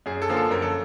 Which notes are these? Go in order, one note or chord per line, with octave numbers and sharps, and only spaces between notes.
F#2 G#4
A4
D3 F3 A#3
A4
F#2 A#4
A4